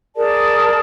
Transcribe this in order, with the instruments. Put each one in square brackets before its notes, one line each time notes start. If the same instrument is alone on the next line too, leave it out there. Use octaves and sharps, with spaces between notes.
[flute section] G#4 A#4 D5 A5